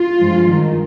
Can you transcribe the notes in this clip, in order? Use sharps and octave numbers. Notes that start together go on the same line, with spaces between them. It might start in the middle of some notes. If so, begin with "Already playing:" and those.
Already playing: F4
G2 F3 G#3
G2 D#3 G#3